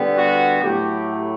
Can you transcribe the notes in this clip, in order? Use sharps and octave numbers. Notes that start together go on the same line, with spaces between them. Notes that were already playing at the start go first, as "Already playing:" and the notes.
Already playing: D3 G3 B3
F#4
A2 F#3 A3 G4